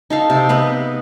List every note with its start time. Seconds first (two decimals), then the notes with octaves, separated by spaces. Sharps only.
0.10 D#4 A4 F5
0.30 C3
0.49 B3 B4 D#5